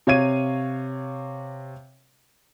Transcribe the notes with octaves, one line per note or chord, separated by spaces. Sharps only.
C3 C#5 F5 G#6 D#7